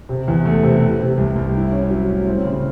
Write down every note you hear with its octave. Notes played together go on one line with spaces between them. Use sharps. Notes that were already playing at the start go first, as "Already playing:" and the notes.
C3
E2
A3
C3
C3
C3
C2
C2
E4
C#4
F#3
A2
C4
C#3